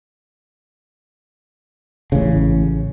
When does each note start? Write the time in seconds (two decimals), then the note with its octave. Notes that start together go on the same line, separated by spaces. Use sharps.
2.12 A1 C#3